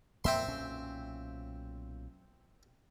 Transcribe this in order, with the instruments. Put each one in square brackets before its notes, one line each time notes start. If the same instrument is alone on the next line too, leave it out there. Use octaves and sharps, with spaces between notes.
[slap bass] F2 A#2 A#3 [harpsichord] C4 E5 C6
[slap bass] B1 A#2 C#4